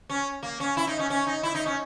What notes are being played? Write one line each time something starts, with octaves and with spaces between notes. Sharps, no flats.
C#4
A#3
C#4
E4
D#4
C#4
C#4
D#4
E4
D#4
C#4